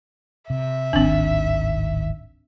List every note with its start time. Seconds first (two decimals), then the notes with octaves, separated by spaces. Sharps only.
0.50 C3 E5
0.93 D1 G#1 D#3 C4 D4